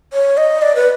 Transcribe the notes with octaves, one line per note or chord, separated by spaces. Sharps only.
C#5
D#5
D5
B4